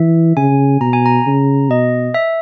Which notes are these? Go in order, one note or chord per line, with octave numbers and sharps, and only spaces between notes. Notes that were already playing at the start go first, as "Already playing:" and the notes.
Already playing: E3 E5
C#3 G#5
B2 A#5
G#5
A#5
C#3
B2 D#5
E5